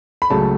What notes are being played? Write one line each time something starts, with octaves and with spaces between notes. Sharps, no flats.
B5
C#2 C#3 F#3 A3 A5